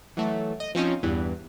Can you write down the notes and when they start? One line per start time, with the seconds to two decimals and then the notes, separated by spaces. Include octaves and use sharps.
0.17 E3 F#3 A3
0.60 D#5
0.75 F3 C4 C#4 D#4
1.03 E2 G2 E3